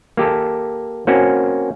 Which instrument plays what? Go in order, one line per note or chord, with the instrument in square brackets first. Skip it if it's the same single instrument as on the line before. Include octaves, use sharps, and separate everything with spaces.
[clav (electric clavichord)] A#3 G4 A4
A#3 C4 C#4 F#4